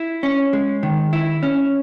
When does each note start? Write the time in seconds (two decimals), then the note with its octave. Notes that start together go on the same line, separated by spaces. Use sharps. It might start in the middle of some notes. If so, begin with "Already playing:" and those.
Already playing: E4
0.23 C#4
0.53 G#3
0.83 D#3
1.13 E4
1.43 C#4